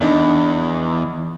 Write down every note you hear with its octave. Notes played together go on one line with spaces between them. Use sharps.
E2 D4 D#4